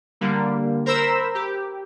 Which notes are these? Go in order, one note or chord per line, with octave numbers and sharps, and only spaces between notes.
D3 G3 A#3
A#4 C5 A#5 B5 E6
G4